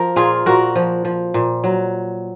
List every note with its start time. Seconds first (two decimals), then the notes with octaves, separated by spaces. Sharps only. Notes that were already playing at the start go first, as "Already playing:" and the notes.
Already playing: F3 A#4
0.16 A#2 F4 G#4
0.46 A#2 F#4 A#4
0.75 F3
1.05 F3
1.34 A#2
1.64 F#3